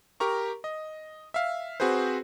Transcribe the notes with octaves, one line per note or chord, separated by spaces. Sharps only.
G4 A#4 A#5 C#6
D#5
E5 F5
C4 F#4 G#4 B4 C5